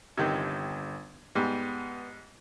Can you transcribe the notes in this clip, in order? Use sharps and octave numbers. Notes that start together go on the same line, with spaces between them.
G1 C3 D#3 G#6
G#2 G3 B3